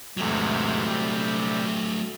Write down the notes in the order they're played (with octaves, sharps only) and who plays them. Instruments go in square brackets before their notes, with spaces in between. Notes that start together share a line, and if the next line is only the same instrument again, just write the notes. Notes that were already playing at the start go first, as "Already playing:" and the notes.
[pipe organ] E2 G#2 C3 [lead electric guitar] F#3 A3
[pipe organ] C3 G3